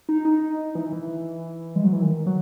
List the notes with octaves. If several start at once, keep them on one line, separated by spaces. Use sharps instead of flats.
D#4
D#4
E3
E3
G#3
F#3
E3
D#3
F#3